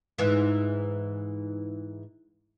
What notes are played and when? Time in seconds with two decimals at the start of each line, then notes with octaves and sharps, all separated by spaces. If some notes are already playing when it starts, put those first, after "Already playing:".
0.18 G#2 E3